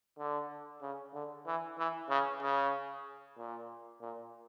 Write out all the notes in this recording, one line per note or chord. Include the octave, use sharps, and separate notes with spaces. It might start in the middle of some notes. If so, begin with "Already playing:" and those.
D3
C#3
D3
E3
E3
C#3
C#3
A#2
A#2